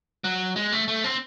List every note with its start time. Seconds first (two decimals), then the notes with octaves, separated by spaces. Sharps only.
0.24 F#3
0.56 G#3
0.72 A3
0.88 A3
1.04 C4